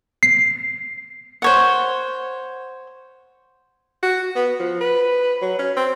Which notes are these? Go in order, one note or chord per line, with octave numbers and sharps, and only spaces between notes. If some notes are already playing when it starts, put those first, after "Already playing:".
C7
C5 C#5 F#5
F#4
B3
F3
B4
F#3
C#4
C4